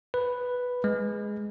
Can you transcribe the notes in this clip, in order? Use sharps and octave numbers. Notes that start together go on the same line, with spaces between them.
B4
G#3